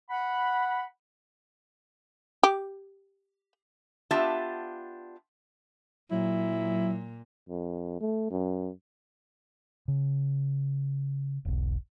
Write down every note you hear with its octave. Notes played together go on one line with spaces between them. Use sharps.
F#5 B5
G4
B3 D4 F4 G4 E5 A5
A#2 F#3 E4
F2
A3
F#2
C#3
E1 B1